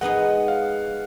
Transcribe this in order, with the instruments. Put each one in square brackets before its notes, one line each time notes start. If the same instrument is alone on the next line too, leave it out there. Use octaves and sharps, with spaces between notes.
[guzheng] G#3 B3 D#4 G#4 [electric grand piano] F#5
[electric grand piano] F5